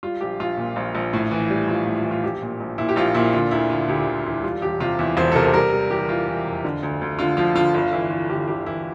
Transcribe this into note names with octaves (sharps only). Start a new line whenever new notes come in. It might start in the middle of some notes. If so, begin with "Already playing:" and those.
G3 F4
A#1 G4
A#1 F4
A#2
A#1
A#1
A2
E3
G3
A#1 F4
A2
F4
E3
F4
A#1 G4
A#2
A#1
A#2 E4
G4
A#1 F4
A#2 E4
D3 F4
D2 E4
D3 F4
D2 G4
D2
E1 E4
G3 F4
E1 G4
C3 F4
E2 E4
E1 C5
A4
C3 A#4
C5
G3 A#4
G3
E3 G4
E3 F4
E3
F1
D3
D2
D2
D3 F4
F3 F4
D3 F4
G1 F4
E3 E4
E3 F4
G1 G4
G1 G4
E3 E4